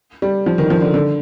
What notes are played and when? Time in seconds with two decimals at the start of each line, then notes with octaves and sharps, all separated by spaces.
0.22 G3
0.46 F3
0.58 D#3
0.70 F3
0.82 D3
0.94 D3